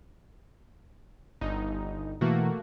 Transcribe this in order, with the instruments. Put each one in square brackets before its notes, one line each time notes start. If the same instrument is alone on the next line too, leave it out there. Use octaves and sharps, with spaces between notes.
[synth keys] G1 D#4
[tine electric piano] B2 E3 [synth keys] A3 A#3 F#4